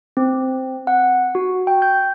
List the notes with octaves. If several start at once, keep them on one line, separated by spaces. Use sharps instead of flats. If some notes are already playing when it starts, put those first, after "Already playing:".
C4
F#5
F#4
G5
G6